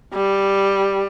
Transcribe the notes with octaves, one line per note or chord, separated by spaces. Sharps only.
G3